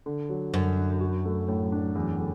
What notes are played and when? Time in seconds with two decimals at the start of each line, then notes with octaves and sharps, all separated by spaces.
0.06 D3
0.29 F#3
0.54 F#2 D3
0.77 D4
1.00 F#4
1.25 A3
1.48 A2
1.72 D4
1.95 E2
2.19 D3